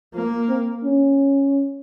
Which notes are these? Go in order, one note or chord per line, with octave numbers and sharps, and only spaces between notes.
F3 A#3
C4
C#4